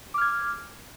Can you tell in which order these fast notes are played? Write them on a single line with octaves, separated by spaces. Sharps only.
D6 F6 G#6